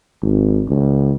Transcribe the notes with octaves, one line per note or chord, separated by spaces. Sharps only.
G#1
C#2